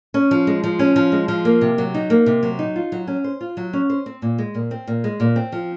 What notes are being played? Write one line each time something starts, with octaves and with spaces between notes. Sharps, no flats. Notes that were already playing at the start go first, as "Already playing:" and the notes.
C#4
F3
G#3
F3
C#4
F3
G#3
F3
A#3
C3
F#3
D#4
A#3
C3
F#3
D#4
F4
F#3
C#4
C5
F4
F#3
C#4
C5
C4
A#2
G#3
A#2
C4
A#2
G#3
A#2
C4
F3